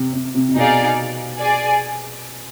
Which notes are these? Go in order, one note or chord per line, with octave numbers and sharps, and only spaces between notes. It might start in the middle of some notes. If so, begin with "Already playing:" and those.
Already playing: C3
C3
C3
C3
B2 D#4 G#4 D5 F5
G#4 D5 G#5